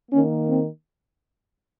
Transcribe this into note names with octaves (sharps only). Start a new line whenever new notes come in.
D#3 A#3 C#4
C4